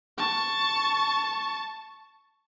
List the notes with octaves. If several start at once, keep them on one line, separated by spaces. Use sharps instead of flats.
A5 C#6